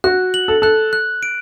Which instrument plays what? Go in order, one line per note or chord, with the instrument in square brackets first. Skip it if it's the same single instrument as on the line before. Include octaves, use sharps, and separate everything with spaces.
[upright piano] F#4 [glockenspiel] F#6
[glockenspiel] F#7
[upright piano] A4
[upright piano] A4 [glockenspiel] F#6
[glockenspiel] F#6
D7